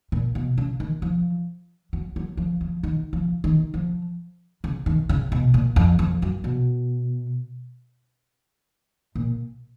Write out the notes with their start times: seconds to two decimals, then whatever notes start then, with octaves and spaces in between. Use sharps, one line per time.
0.12 A#2
0.35 B2
0.58 C#3
0.80 D#3
1.02 F3
1.93 F#3
2.16 F#3
2.37 F3
2.61 F3
2.83 D#3
3.13 F3
3.44 D#3
3.74 F3
4.64 C#3
4.86 D#3
5.09 C#3
5.32 B2
5.54 A#2
5.76 F2
5.99 F2
6.22 F#2
6.44 B2
9.15 A#2